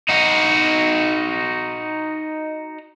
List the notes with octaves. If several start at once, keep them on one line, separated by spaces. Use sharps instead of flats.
D#4 F#4